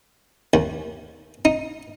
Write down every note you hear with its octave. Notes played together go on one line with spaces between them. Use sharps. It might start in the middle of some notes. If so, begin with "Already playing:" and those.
D#2
D#4